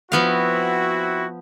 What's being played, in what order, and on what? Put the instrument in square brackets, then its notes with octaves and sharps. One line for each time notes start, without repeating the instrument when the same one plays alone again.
[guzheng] F3 B3 F5 [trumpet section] C4 E4 F#4